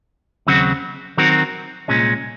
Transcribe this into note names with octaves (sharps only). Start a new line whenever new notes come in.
D#2 C#3 F#3 C4 F#4
D#3 F#3 C4 F#4 A#4
C2 A#2 G#3 C#4